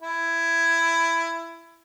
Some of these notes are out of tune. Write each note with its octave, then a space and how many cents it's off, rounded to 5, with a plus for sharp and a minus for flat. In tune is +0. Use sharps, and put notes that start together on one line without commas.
E4 +15